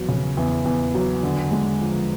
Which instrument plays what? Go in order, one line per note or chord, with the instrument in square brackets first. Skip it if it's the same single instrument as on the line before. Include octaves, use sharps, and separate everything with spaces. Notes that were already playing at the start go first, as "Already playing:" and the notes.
Already playing: [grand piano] E2 F#3
C#3
E2
E2
F#3
D3
G#3
F3